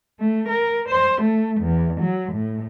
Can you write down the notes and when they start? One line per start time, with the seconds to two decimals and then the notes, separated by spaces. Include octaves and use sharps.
0.20 A3
0.49 A#4
0.89 C5
1.21 A3
1.61 E2
2.01 F#3
2.33 A2